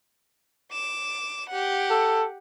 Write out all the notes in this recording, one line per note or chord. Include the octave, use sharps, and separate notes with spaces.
D6 E7
G4 F#5
A4